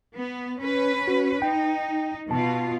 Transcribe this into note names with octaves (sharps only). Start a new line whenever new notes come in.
B3
C#4 B4
F#4
D#4 G5
B2 F4 A5